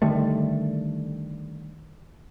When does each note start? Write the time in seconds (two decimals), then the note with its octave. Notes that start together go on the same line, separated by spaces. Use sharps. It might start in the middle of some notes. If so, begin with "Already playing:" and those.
0.02 D3 D#3 G3 A3